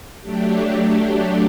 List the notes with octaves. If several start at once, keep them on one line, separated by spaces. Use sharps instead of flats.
F#3 A3 D4 G4